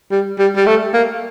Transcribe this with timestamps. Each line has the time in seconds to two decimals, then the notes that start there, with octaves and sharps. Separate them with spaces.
0.12 G3
0.39 G3
0.56 G3
0.67 A3
0.94 A#3